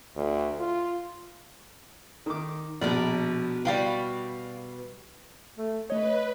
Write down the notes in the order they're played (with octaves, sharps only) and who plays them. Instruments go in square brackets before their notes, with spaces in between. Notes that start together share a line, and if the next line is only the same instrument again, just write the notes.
[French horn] D2
F4
[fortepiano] D#3 D6
[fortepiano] A#1 [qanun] B2 A#4 D5
[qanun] G3 F#4 B4 [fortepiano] D5 F5 G5
[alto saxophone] A3
[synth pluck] A3 C#5 [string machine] B4 [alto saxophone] D#5